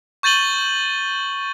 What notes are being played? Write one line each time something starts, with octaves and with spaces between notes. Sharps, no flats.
C#6 G6 A6 D#7 F#7 G7